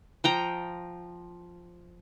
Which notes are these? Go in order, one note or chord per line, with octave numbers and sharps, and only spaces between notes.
F3 G5 A#5